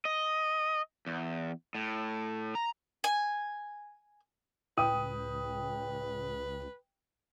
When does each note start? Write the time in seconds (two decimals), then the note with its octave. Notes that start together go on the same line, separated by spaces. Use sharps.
0.05 D#5
1.06 E2
1.75 A2
2.55 A#5
3.04 G#5
4.78 C#2 A2 B4 G5 D#6 D#7